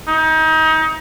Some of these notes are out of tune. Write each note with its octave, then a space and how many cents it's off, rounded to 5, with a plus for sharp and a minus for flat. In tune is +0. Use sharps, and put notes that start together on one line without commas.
D#4 +30